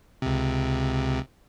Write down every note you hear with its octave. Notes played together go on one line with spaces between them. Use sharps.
C#2 C3